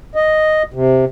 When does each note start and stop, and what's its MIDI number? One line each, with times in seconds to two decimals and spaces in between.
0.15 0.63 75
0.74 1.05 48